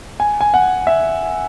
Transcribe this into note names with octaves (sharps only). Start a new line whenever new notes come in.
G#5
G#5
F#5
E5